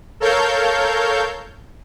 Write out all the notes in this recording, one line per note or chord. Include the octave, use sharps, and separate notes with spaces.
A4 A#4 C#5 F5 G6